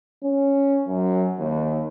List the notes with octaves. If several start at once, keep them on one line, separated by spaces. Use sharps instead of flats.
C#4
F#2
D#2